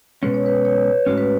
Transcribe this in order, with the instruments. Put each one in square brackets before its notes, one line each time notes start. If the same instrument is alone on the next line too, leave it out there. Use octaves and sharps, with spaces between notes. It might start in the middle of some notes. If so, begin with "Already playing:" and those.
[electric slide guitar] B2 G#3 C#4 [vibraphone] B4
[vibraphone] C#5
B4
C#5
[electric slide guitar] A2 G#3 C#4 [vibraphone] F#4
[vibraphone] B4